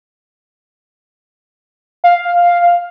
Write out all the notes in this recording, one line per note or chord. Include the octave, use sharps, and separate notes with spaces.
F5